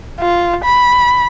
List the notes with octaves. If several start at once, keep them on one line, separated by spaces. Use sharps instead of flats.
F4
B5